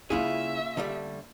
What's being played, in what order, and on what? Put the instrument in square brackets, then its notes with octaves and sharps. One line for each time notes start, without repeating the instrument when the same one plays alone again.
[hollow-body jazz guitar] C#2 E4 G#4 [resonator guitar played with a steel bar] C#3 F4 [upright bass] A#3 C#4 [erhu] E5
[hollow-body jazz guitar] D3 G3 A3